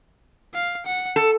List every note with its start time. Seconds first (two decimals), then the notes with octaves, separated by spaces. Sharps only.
0.54 F5
0.86 F#5
1.16 A4